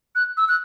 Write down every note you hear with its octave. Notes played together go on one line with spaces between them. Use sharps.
F#6
E6
F#6